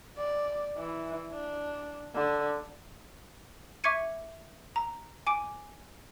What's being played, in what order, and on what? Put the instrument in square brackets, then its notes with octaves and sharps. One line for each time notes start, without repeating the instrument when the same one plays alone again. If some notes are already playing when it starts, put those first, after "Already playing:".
[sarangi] D5
E3
D4
D3
[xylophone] E5 C#6 D6 G#6 C#7 D#7
A#5
G#5 D6 D7